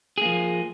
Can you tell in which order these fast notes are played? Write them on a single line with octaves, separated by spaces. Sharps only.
G#4 A#3 F3